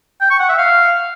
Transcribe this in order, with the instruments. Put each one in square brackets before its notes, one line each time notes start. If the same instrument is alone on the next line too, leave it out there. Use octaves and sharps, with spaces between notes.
[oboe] G5
C#6
F#5
E5
F5